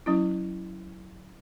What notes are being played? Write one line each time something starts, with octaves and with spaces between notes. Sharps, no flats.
F#3 C#4 E4